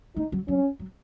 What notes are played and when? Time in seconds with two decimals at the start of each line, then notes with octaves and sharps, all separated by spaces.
0.16 A3 D#4
0.32 F#3
0.48 F#3 C#4
0.79 F#3